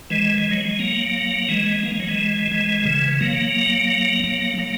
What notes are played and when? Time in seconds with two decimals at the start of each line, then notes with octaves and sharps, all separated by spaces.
0.10 E3 G#3
0.38 E3
0.51 F#3
0.65 G#3
0.79 F#3 A#3
1.49 E3 G#3
1.83 A#3
1.91 G#3
2.00 F#3
2.07 E3 G#3
2.51 E3 G#3
2.85 C#3 E3
3.20 F#3 A#3
4.24 F#3 A#3
4.58 F#3 A#3